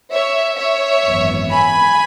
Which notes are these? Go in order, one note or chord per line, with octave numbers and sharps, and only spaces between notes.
C#5 E5
C#5 E5
G#1 F#2 E3 B3
G#5 B5